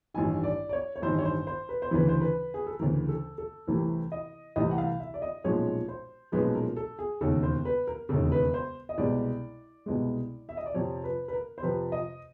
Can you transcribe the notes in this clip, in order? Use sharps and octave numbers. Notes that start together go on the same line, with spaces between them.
A1 G2 D#3 G#5
D5
D5
C#5
C#5
A1 G2 D#3 C5
C#5
C5
C5
B4
C5
D2 C#3 E3 B4
C5
B4
G#4
A4
D2 C#3 E3 A#4
A4
A4
C2 C3 E3 A3 A#4
D#5
C2 C3 E3 A3 D#5
F#5
F5
E5
D5
D#5
B1 A#2 F3 G#3 C#4 C#5
C5
B1 A#2 F3 G#3 C#4 B4
A#4
A4
G#4
E1 D#2 C#3 A4
C5
B4
A#4
E1 D#2 C#3 A4
B4
C5
D#5
C2 B2 G#3 D5
C2 B2 G#3
E5
D#5
D5
F2 C3 F3 C#5
B4
B4
A#4
C5
F2 C3 F3 B4
D#5